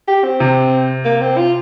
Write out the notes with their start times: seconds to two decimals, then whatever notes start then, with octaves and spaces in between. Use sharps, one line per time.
0.08 G4
0.24 C4
0.40 C3
1.05 A#3
1.22 C4
1.38 F4